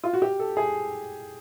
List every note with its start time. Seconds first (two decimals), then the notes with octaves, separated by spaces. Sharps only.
0.04 F4
0.13 F#4
0.22 G4
0.39 A4
0.57 G#4